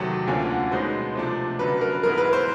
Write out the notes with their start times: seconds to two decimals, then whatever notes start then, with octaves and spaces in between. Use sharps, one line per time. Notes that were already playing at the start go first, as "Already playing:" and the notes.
Already playing: E2 C3 D#3 F#3 A3
0.27 D2 D3 F3 A#3 C#4 G#5
0.49 F#5
0.71 B2 G#3 B3 D#4 C5
1.15 C3 F3 A3 D4
1.59 F#2 D3 F#3 B4
1.81 A#4
2.03 G#2 E3 G#3 B3 E4 A#4
2.18 B4
2.33 C5